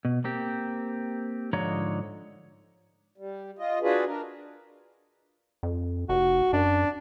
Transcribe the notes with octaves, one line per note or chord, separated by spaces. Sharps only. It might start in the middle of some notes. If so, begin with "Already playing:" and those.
B2
A#3 C4 G4
G#2 D3 F3 D#4 C#5 A#5
G3
F4 D#5
D4 F4 F#4 G#4 B4
D4 A#4
F2
F1 F#4
F#2 D4